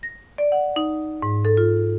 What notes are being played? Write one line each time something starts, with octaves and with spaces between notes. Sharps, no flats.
A#6
D5
F#5
D#4
G#2
A4
F4